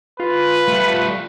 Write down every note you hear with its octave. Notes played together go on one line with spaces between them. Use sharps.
F4 B4
G3 A3